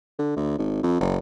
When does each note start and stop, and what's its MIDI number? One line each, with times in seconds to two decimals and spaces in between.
0.19 0.32 50
0.36 0.56 38
0.58 0.80 32
0.83 0.96 41
1.00 1.18 30